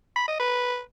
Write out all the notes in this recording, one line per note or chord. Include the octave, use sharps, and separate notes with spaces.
B5
D#5
B4